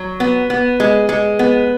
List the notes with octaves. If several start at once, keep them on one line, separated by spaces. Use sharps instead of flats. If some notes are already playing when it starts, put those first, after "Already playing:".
Already playing: F#3
B3
B3
G#3
G#3
B3